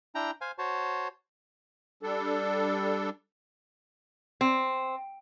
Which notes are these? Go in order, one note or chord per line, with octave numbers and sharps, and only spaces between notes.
D4 E4 G5 A#5
C5 F5 G#5
F#4 C5 C#5 A5
G3 D4 A4
C4